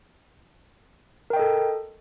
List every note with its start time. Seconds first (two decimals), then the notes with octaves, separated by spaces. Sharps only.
1.30 A#4
1.33 G5
1.36 D#5
1.39 A4